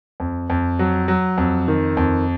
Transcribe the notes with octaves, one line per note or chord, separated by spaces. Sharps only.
F2
F2
F#3
F#3
F2
D#3
F2